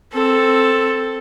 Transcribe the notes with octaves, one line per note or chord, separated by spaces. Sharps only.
C4 A4